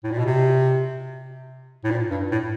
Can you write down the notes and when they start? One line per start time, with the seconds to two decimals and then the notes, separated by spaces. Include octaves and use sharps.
0.04 A2
0.11 A#2
0.19 B2
0.26 C3
1.84 A2
1.90 A#2
2.11 G2
2.31 A2